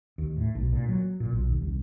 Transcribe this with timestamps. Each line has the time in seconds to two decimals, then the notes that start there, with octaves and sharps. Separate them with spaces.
0.18 D#2
0.36 A2
0.55 B1
0.73 A#2
0.89 F#3
1.20 A#2
1.33 B1
1.50 D#2
1.62 C2